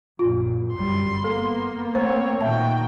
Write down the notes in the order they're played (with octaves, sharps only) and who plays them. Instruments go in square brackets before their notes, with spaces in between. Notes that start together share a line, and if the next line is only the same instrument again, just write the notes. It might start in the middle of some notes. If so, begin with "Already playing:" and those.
[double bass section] A#1 F#2 [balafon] F4
[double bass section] G1 F#2 G3 [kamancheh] C6
[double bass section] A#3 B3 [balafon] A4
[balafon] A3 C5 [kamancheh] C4 C#5
[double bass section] A#2 D#3 [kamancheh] F#4 G5 [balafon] E5 A5